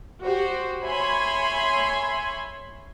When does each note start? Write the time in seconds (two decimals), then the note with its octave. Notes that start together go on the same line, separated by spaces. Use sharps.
0.23 F#4 G4 C5
0.84 C#5 E5 G#5 B5 C6